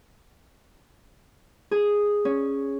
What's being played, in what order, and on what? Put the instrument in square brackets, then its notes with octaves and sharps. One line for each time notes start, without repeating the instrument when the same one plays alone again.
[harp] G#4
C#4